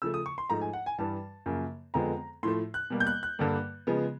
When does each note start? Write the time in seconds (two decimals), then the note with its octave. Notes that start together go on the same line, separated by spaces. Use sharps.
0.02 C#3 F3 A3 E6
0.14 D#6
0.26 C#6
0.38 C6
0.50 G#2 F3 A3 A#5
0.61 G#5
0.73 F#5
0.86 G#5
0.99 G2 E3 G3 A5
1.46 F#2 C#3 F3 A#3
1.94 F2 D3 F3 G#3 B3 A#5
2.43 A2 F3 A3 C6
2.74 F#6
2.90 B2 G3 A#3
3.00 G6
3.07 F#6
3.23 F#6
3.39 G2 D3 G3 A#3
3.87 C#3 F3 G#3 B3